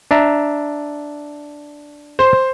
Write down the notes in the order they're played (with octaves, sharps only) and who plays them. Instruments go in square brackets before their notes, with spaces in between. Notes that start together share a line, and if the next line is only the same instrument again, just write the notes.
[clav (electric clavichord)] D4 E5 A#5
[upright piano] C5